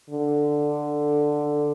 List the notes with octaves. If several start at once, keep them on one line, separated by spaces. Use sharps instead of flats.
D3